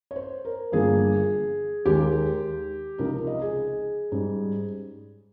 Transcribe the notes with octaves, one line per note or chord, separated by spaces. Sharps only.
C#5
C5
A#4
G1 G2 F3 A#3 G#4
D#2 D#3 G#3 G4
C#2 C3 F3 C4 D#4 A#4
D#5
G#4
G#2 G3 C#4